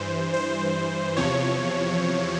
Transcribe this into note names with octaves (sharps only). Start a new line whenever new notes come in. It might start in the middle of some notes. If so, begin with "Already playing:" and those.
Already playing: G2 E3 C5
C5
E2 C3 F3 C#5